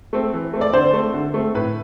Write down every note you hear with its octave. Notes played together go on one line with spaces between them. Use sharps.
A3 C4
E3
A3 C4
D5
D3 C5
A3 C4
D3
A3 C4
A2 B4